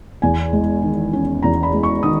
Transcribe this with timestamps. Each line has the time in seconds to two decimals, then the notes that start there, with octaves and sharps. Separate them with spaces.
0.22 E2 G#5
0.53 G#3
0.82 D#3
1.13 C#4
1.42 E2 A#5
1.63 B5
1.73 G#3
1.83 C#6
2.03 D#3 D#6